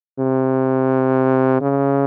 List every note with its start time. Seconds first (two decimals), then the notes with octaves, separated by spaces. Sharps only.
0.19 C3
1.61 C#3